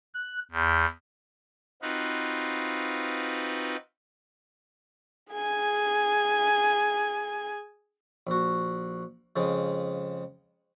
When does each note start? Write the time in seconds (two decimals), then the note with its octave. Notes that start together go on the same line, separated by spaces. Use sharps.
0.14 F#6
0.52 E2
1.82 C4 D#4 F4 F#4 B4
5.33 G#4 G#5
8.27 A#1 F#4
9.36 F2 C#3 G#3